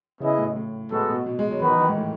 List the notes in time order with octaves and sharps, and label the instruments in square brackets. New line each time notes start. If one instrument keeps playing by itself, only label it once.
[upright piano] C#3 [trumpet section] B3 E4 G#4 D#5
[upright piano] A2
A2
[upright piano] A2 [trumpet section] G#3 B3 F#4 A4
[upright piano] B2
B2
G#3
F#3
[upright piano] D#3 [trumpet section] B3 D#4 F#4 B4
[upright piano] E3
D#3
G#2
A2